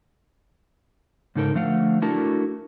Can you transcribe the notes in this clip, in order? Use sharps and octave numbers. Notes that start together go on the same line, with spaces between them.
G#2 C#3 D#4 A4 A#4
D3 F3 A3 F5 F#5
A3 D4 E4 F#4 A#4 A5